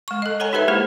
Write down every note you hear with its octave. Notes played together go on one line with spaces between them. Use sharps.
G#3 C#6
A4 D#5
A4 C#5 F#5 G#5 A#5
D#4 G4 A4 B4 C5 E5
G#3 A#3 E4 G#4 C5